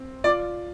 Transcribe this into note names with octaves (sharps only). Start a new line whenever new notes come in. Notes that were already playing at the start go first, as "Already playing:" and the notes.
Already playing: C4
F4 D5